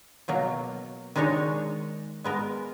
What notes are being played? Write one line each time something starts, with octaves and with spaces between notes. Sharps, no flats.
B2 F#3 A#3
D#3 G#3 D4 D#4 C#5
G#3 B3 A#4